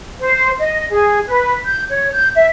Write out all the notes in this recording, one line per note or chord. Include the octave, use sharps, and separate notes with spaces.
C5
D#5
G#4
B4
G6
C#5
G6
E5